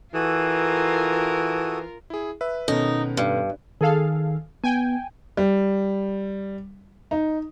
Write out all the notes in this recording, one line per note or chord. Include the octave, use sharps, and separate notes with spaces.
E3 F4 F#4 A4 A#4 D#6
E4 G#4
B4 E5
B2 D#3 B3 C#4 D#4 A4
G2
D#3 G#4 A4 F5
B3 G5 G#5
G3
D#4